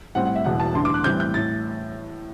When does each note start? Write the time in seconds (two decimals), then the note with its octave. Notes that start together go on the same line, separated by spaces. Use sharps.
0.15 A2 G3 C4 F#5
0.25 F#5
0.35 E5
0.44 E1 E2 B2 F#5
0.60 A5
0.75 A1 G2 D3 C6
0.85 D6
0.94 F#6
1.04 A2 E3 G3 C4 E4 G6
1.20 G6
1.34 A2 A6